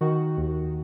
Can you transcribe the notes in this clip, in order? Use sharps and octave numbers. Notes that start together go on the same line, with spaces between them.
D#3 F#4
D#2